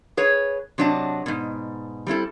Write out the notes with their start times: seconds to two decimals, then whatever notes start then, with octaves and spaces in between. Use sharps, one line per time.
0.17 G#4 B4 C#5
0.78 C3 F#3 D4 D#5 A5
1.26 G#2 B2
2.07 G3 C4 E4 A4